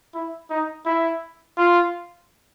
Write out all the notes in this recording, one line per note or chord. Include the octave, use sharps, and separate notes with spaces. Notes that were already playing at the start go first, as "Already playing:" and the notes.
E4
D#4
E4
F4